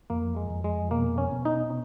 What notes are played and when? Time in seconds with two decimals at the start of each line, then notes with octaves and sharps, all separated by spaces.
0.10 F2 A#3
0.36 G#3
0.50 F2
0.64 G#3
0.91 B2 A#3
1.18 C#4
1.31 B2
1.45 D#4